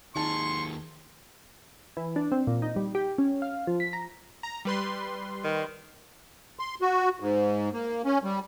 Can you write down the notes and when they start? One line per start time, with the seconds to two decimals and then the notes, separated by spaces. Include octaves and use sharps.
0.16 D#2 D#4 G#4 A5 C6 C#6
1.97 E3
2.16 D4
2.32 C4
2.47 A#2
2.62 D#4
2.76 G3
2.95 G4
3.18 C#4
3.42 F5
3.67 F3
3.80 B6
3.93 A#5
4.43 A#5
4.65 G3 B4 C6
5.44 D#3
6.59 C6
6.82 F#4
7.20 G#2
7.73 A#3
8.05 C#4
8.24 G3